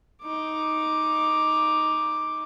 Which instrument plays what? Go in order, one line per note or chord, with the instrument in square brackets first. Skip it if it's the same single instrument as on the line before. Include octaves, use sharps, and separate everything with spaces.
[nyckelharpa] D#4 D6